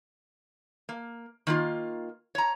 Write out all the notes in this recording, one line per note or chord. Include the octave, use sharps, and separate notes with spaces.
A#3
D#3 A#3 F4
C#5 A#5